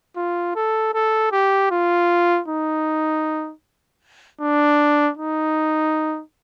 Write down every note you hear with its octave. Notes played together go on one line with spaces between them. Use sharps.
F4
A4
A4
G4
F4
D#4
D4
D#4